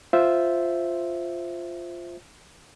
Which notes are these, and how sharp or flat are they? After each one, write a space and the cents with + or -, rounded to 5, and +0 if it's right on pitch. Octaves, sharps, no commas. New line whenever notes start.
F4 +0 C5 +0 E5 +0